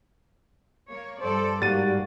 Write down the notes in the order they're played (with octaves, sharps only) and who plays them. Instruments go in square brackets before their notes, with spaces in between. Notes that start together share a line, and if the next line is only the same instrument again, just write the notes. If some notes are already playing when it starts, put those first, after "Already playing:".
[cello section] A#3 C#5
[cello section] G2 A4 D5 [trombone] C5
[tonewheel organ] G#2 G3 [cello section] A#3 [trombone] F#4 [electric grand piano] A6 D#7